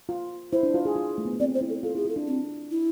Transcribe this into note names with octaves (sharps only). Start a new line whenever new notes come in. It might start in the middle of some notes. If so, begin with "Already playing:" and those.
F4
E4 C5
D4
F4
G#4
F4
A3
B3
A3
C4 D5
C5
E4
A4
F4 A4
E4 G#4
F4 A4
D4
C4
E4